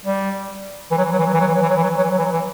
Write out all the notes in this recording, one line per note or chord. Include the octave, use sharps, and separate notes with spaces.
G3
E3
F#3
E3
F#3
E3
F#3
E3
F#3
E3
F#3
E3
F#3
E3
F#3
E3
F#3
E3
F#3
E3
F#3
E3